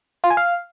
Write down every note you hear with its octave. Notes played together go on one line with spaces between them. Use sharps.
F4
G#5
F5